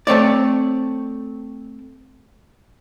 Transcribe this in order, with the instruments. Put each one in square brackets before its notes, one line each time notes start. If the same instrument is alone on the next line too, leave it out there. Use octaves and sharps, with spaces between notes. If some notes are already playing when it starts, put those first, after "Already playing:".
[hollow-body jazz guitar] A3 C4 C#5 D5